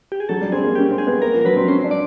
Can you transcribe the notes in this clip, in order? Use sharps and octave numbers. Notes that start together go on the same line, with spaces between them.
G4
G#4
F#3 A4
G3
C4 G#4
A#3
C#4 G4
C4
G#4
B3
A#3 A#4
F3
A#4
F#3 B4
C4
C#4 C5
D4
D5